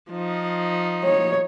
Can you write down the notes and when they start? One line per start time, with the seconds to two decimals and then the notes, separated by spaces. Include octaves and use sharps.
0.10 F3 D#4
1.04 C#5